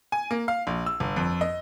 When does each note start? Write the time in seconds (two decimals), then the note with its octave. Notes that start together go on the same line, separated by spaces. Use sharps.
0.12 G#5
0.31 A#3
0.48 F5
0.67 A#1
0.86 E6
1.00 G1
1.16 F2
1.41 D#5